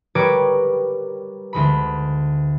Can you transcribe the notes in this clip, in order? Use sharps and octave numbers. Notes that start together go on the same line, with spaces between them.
G3 A#4 B4 C#5 D6 G#6
D2 G#3 B5